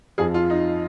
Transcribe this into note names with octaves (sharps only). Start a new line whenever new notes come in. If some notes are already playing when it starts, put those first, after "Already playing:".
F2 F3 G#4
F4
D#4